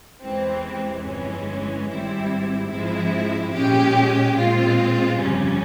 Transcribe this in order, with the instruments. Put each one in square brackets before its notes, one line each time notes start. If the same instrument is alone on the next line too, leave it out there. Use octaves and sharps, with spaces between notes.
[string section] E2 C3 E3 G#3 C4
G1 F2 E3 G#3 C#4
G#1 G#2 G3 C4 E4
G#2 F3 G#3 C4 E4
A#2 G#3 C#4 G4
A#2 G#3 C4 F4
G1 F2 C#3 G3 C#4